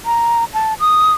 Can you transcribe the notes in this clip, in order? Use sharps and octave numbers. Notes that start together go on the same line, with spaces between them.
A#5
A5
D#6